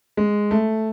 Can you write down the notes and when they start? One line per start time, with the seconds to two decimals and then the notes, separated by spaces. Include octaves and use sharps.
0.17 G#3
0.51 A3